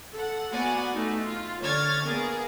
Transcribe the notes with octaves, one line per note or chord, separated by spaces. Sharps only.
A4 F#5
A#3 B3 F#4 D5 F#5 G#5
A3 D#4
F4
D3 C#5 F6 G#6 A6
A#3 B3 G#4 A#4